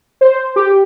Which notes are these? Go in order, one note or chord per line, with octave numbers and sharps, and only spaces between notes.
C5
G4